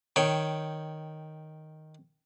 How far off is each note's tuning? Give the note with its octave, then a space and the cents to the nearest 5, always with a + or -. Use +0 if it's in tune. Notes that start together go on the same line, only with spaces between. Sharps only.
D#3 +0 C#5 +0 G5 +0